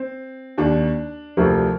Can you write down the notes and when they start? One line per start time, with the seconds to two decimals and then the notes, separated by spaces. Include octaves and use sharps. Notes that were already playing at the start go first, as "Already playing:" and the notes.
Already playing: C4
0.58 D#2 D#3 D4
1.37 D2 C3 F3 A#4